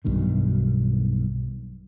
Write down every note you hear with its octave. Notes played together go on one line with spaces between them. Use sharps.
B1 G2 B2 D#3